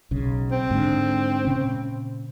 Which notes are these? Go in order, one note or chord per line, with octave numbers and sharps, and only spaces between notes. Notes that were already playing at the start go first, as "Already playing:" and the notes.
B1 C#3
C4
G#2 D3
A#2 C#3 C#4